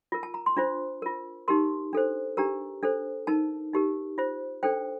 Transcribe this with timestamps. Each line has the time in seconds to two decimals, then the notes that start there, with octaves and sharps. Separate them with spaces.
0.12 F4 A#4
0.23 A5
0.34 A#5
0.46 C6
0.57 D4 F4 C5
1.02 F4 A#4
1.48 D#4 G4 A#4 C6
1.93 D4 A4 C5
2.37 D4 G4 A#4 A#5
2.83 D4 A4 C5
3.27 D#4 A#4 A5
3.74 D#4 G4 A#4
4.18 F4 C5
4.63 D4 A4 C5 G5